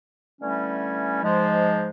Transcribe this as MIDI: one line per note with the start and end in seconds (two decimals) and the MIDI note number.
0.42 1.22 50
0.42 1.22 52
0.42 1.22 55
0.42 1.22 57
0.42 1.22 61
1.23 1.90 44
1.23 1.90 53
1.23 1.90 56